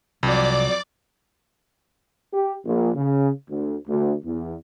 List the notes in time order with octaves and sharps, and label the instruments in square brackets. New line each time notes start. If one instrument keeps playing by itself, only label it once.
[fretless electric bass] C2 [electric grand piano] F2 F#3 [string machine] D5 D6
[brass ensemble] G4
A#1
C#3
D2
D2
E2